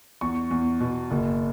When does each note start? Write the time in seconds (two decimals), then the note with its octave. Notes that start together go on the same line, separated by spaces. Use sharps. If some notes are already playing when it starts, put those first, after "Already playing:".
0.21 E2 C#6
0.51 E2
0.80 B2
1.11 F#1